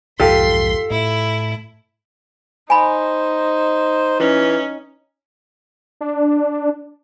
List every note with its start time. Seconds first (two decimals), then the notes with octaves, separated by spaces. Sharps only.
0.20 B1 F2 G#2 F4 G4 A4 C6 B6
0.91 A2 E4
2.70 D#4 C5 G#5 B5
4.20 E3 C#4
6.01 D4